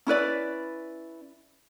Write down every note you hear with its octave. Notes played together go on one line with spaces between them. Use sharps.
C#4 E4 B4 D5